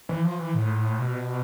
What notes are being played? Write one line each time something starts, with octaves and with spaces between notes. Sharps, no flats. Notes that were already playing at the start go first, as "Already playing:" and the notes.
E3
F3
E3
A2
B2